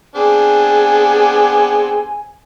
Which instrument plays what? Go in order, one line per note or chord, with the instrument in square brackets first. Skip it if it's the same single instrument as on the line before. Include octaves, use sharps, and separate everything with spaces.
[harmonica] B3 C4 D4 [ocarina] G#4 [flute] G#5